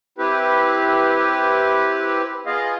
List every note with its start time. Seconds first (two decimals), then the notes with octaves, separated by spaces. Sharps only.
0.18 C4 E4 G4 B4
2.46 B3 F4 G#4 D#5 F5